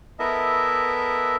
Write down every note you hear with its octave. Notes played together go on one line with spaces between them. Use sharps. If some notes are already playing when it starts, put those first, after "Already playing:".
B3 E4 A4 A#4 D#5 E5